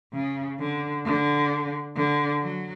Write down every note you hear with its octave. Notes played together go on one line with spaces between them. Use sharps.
C#3
D3
D3
D3
F#3